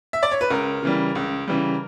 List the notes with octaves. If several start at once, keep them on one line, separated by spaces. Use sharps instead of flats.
E5
D5
C#5
B4
C#2 A#4
C#3 E3 G3
C#2
C#3 E3 G3